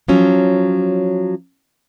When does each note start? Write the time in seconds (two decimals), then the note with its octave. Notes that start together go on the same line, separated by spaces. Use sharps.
0.08 F3 F#3 C#4